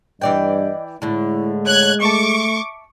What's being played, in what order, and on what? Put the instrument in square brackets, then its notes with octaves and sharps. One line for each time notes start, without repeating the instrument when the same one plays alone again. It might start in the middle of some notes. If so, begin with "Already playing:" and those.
[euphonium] G2 [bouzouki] E3 D5 G5 [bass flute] D#5
[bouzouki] A2 D3 [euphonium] G#3 [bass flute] E4
[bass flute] C#5 [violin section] F#6 G#6
[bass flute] A3 [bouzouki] E5 A5 [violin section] C#6 D6